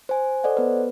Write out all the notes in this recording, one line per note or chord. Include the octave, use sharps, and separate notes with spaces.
C5 G#5
A4 C5 D5 D#5 F#5
B3 B4